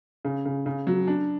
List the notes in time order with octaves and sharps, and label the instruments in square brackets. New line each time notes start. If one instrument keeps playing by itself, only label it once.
[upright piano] C#3
C#3
C#3
F#3
D4